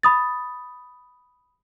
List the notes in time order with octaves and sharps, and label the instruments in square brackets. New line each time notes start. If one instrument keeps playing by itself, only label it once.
[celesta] B5 D#6 A6